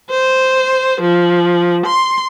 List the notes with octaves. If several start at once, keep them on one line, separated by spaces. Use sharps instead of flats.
C5
F3
C6